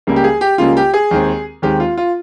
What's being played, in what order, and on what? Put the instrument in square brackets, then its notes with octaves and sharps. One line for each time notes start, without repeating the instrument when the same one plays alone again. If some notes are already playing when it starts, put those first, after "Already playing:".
[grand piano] C#2 C#3 G3 A#3
G4
G#4
G4
C#2 C#3 G3 A#3 F4
G4
G#4
D#2 D#3 G#3 C4
D#2 D#3 G#3 C4 G4
F4
F4